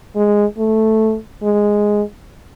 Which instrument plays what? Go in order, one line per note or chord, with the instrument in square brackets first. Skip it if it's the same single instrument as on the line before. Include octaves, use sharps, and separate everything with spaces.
[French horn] G#3
A3
G#3